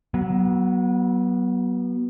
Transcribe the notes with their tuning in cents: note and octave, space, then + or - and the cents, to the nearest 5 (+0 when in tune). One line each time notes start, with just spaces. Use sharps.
F#3 +20 B3 -25